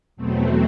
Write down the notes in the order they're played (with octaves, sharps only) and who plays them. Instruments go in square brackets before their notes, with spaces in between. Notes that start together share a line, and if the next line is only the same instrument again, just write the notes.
[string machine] E2 B2 F#3 A3 C4